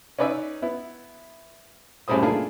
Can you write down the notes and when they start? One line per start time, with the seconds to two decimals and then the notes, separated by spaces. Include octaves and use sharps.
0.19 C#4 D#4 B4 D5 E5
0.62 B3 E4
2.08 F#2 A2 C#3 G3 C5 D#6
2.23 A#3 D4 E4 F4 G#4 A4